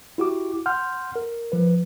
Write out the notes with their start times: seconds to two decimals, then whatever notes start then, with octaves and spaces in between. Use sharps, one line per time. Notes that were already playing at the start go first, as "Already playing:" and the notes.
0.18 E4 F#4 G4 D6
0.66 F#5 C6 F6 G6
1.16 A#4
1.52 F3 B4